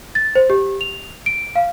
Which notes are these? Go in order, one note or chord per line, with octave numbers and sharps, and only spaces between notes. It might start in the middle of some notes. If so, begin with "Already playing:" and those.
A6
C5
G4
F7
D7
F5